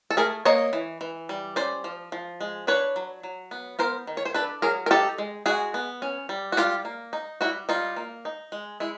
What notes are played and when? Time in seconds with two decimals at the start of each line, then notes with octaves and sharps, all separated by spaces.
0.10 A4
0.17 A3 G#4 A#4
0.45 A#3 C#5 D#5
0.73 E3
1.01 E3
1.29 G3
1.56 C#4 C5 D5
1.84 F3
2.12 F3
2.41 G#3
2.67 D4 B4 C#5
2.96 F#3
3.23 F#3
3.51 B3
3.79 B3 A#4 C5
4.07 D#3
4.17 C#5
4.25 C5
4.34 D4 A4 B4
4.62 F#3 G#4 A#4
4.86 A#4
4.91 D#4 G4 A4
5.18 G#3
5.46 G#3 F#4 G#4
5.74 B3
6.02 C#4
6.29 G3
6.52 F#4
6.57 G3 F4 G4
6.85 A#3
7.13 D#4
7.41 G3 E4 F#4
7.69 G3 D#4 F4
7.96 A#3
8.25 D#4
8.52 G#3
8.80 G#3 E4